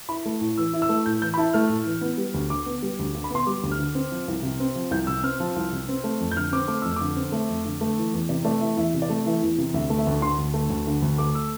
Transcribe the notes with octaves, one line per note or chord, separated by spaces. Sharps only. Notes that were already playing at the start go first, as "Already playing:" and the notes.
E4 B5
A3
A2
E3 E6
E4
E6
A3
A2 G6
E3 G6
B5
E4 A5
A3 F6
A2
E3
B3
G3
D2
D3 D6
B3
G3
D2
D3
B5
B3 C6
G3 D6
D2
F6
D3
C4
F3
C2
C3
C4
F3
C2 G6
C3 E6
C4 F6
F3
C2
C3
C4
A3
F2
G6
D3 F6
C4 D6
A3 D6
F2 E6
D3 D6
C4
A3 E5
F2
D3
A3
E3
E2
C3 D5
A3 D5
E3 E5
E2 E5
C3
D5
A3
E3 E5
E2
C3
D2 E5
A3
E5
D2
D3 C6
D2
A3
D2
D3
D2
A3 D6
E6